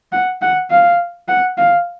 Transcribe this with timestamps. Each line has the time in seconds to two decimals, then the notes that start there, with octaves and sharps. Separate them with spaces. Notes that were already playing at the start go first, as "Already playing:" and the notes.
0.12 F#5
0.42 F#5
0.71 F5
1.28 F#5
1.58 F5